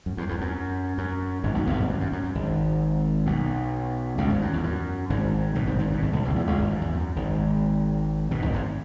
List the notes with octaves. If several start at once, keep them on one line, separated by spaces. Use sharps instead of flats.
F#2
E2
E2
F#2
F#2
G#1 G#2
B1 B2
B1 B2
G#1 G#2
F#2
F#2
F#2
F#2
G#1 G#2
B1 B2
C#2 C#3
G#1 G#2
F#2
E2
F#2
G#1 G#2
B1 B2
G#1 G#2
G#1 G#2
F#2
B2
G#1 G#2
B1 B2
C#2 C#3
E2 E3
C#2 C#3
G#1 G#2
F#2
E2
F#2
G#1 G#2
B1 B2
G#1 G#2
G#1 G#2